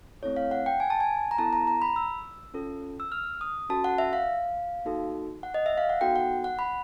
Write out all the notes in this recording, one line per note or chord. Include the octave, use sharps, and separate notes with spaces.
A3 C4 E4 A4 C#5
F5
F#5
G5
G#5
A5
G#5
A#5
B3 E4 A4 A5
A#5
A#5
B5
E6
C#4 F4 A4
E6
F6
D#6
C#4 F#4 A4 A5
F#5
E5
F5
A#3 D#4 F#4 A4
F#5
D#5
E5
F5
F#5
B3 D#4 F#4 A4 G5
F#5
F#5
B5